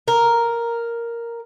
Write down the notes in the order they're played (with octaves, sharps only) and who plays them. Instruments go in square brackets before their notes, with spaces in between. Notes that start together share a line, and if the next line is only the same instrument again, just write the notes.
[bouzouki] A#4